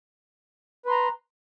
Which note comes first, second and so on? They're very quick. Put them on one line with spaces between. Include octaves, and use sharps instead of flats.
B4 C6 A#5